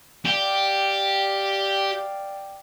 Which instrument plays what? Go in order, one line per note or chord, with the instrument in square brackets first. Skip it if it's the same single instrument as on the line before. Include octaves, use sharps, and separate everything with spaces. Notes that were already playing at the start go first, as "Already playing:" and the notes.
[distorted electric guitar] G4 [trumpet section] D5 F5 G5